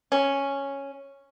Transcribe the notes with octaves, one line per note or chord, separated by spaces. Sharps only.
C#4